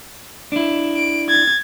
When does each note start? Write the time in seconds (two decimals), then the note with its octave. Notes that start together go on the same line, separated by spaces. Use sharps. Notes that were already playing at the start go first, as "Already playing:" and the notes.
0.52 D4 E4
0.96 D7
1.29 G#6 A6